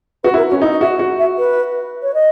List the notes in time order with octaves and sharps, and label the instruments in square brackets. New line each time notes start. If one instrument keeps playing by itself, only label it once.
[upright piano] F#4 [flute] B4
[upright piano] E4 [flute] A#4
[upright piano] C#4 [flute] F#4
[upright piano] D#4 [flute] E4
[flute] D#5
[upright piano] F#4 [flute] E5
[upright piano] F#4
[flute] E5
B4
C#5
D#5